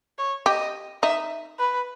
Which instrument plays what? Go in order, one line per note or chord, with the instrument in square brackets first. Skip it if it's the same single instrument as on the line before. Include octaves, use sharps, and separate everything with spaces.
[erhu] C#5
[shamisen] G4 [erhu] D#5
[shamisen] D#4 [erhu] E5
[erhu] B4